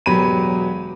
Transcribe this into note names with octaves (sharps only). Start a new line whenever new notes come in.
E1 F#3 B3 G4 B5 D#7